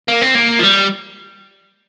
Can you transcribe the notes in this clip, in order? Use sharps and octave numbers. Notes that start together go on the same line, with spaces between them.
A#3
C4
A#3
F3
G3